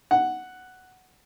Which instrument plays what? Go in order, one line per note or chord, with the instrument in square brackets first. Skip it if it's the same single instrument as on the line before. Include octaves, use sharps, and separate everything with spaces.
[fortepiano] F#5